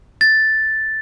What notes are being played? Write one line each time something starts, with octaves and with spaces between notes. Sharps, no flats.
A6